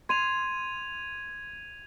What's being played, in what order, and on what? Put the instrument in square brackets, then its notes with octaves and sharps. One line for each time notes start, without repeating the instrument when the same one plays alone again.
[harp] C6 [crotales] G#6 D#7 F7